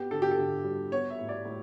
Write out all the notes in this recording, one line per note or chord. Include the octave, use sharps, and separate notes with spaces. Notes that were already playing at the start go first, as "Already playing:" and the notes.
Already playing: B3 G4
D3 A4
G4
A4
D3
G3
B3 C#5
E5
A2
D5
A2